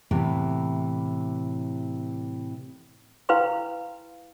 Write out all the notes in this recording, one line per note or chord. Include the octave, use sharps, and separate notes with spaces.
A2 C3 E3 B3
E4 B4 F5 G5 B5 C6